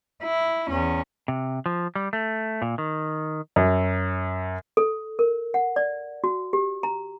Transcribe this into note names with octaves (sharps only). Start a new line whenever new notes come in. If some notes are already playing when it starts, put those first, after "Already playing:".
E4
E2 C#4
C3
F3
G3
A3
A#2
D#3
F#2
A4
A#4
F#5
D5
F#4
G4
A#5